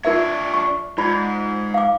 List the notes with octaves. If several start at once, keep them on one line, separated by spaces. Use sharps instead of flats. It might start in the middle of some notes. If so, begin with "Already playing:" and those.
D4 F4 A#4 C#5 E5
C#6
G#2 F4 D5 B5
F5 D6